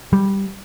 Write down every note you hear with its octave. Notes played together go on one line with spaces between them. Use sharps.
G3